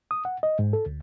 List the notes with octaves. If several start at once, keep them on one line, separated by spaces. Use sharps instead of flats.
D#6
F#5
D#5
G#2
A4
D2